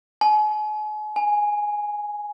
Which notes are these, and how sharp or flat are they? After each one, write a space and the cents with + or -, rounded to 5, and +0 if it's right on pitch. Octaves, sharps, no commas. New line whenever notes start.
G#5 +40
G#5 +0